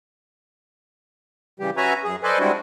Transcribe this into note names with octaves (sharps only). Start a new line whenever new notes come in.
C#3 E3 G3 G4
C#4 F#4 B4 E5 G#5 A#5
F#2 G#4
A4 B4 C5 D5 D#5 G#5
G3 G#3 C4 D4 E4 F#4